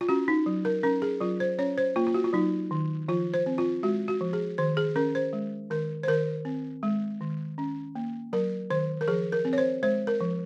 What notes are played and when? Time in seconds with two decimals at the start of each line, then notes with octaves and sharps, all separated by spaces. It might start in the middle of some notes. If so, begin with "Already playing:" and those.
0.01 F4
0.09 C#4 F#4
0.28 D#4
0.46 F#3
0.65 A#4
0.83 C#4 A#4
1.02 G#4
1.20 F#3 F4
1.40 C5
1.58 C#4 C#5
1.78 C5
1.96 A#3 F4
2.07 F4
2.14 F#4
2.24 F4
2.33 F#3 D#4
2.71 D#3
3.08 F3 F4
3.34 C5
3.46 C4
3.58 F4
3.83 G#3 F#4
4.08 F#4
4.21 F3
4.33 G#4
4.58 D#3 C5
4.77 G#4
4.96 C#4 A#4
5.15 C5
5.33 G#3
5.70 D#3 A#4
6.03 C5
6.08 D#3 A#4
6.45 C4
6.83 G#3
7.21 D#3
7.58 C#4
7.95 A#3
8.33 F#3 A#4
8.70 D#3 C5
9.01 A#4
9.08 F3 G#4
9.32 A#4
9.45 C4
9.53 C#5
9.58 C5
9.83 G#3 C5
10.07 A#4
10.21 F3